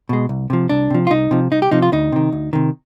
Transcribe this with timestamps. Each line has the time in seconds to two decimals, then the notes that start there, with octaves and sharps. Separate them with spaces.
0.09 B2 G#3
0.29 C2
0.50 C3 F3
0.69 C2 D4
0.90 C3 F3
1.07 F4
1.10 C2 D#4
1.31 C3 F3
1.51 C2 D#4
1.62 G4
1.71 C3 F3 D#4
1.82 F4
1.92 D2 D#4
2.12 C3 D#3
2.32 D2
2.53 C3 D#3